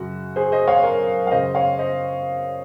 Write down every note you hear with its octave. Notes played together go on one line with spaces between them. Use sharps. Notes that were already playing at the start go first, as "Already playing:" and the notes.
Already playing: F#2 C#3 F#4
G#4 C5
C5 D#5
C#5 F5
A#4 C#5
F5
F#2 C#3 C5 D#5
C#5 F5
C5 D#5